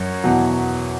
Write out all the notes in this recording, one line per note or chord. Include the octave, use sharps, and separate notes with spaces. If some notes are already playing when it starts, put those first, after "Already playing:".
Already playing: F#2 F#3 C#5
E2 B2 F#3